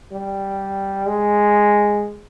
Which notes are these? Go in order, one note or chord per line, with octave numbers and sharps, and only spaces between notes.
G3
G#3